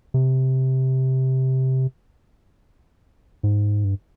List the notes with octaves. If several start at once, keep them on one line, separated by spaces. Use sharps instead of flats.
C3
G#2
G2